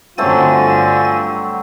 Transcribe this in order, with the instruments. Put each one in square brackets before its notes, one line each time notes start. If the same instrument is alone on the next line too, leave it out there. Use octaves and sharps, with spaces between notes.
[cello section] G2 D3 [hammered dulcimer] F#3 A3 C4 [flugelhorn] F4 [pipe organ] G#5 A6